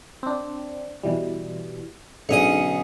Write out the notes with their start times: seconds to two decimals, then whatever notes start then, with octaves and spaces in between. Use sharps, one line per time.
0.23 C4 D4
1.03 B2 E3 G3
2.29 B1 G#2 D3 C#4 D#6 C#7